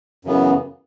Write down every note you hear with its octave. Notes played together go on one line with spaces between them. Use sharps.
F#2 C#3 E3 B3